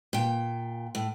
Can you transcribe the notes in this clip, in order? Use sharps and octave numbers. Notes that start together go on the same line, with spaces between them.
A#2 G5
A2